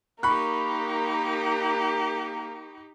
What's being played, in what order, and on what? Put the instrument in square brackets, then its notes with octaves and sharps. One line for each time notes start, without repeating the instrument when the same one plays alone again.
[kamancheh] A#3 A#4 [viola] D#4 G4 [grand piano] B5 C#6 F#6